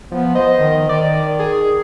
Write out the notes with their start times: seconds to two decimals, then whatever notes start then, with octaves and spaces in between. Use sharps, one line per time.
0.12 F3 B3
0.35 C5 D#5
0.58 D#3
0.89 D#3 D5
1.39 G#4